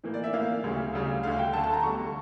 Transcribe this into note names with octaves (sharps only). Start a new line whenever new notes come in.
A2 E3 A#3
D5
E5
A2 E3 A#3 F5
D2 C#3 G3
D2 C#3 G3
D2 D3 A3 F5
G5
D2 D3 A3 A5
A5
A#5
E2 D3 G3 C#6